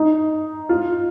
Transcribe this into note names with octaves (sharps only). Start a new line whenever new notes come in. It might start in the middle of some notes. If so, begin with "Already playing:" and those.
Already playing: D#4
F4